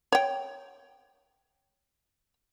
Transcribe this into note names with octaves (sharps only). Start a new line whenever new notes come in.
C#5 G5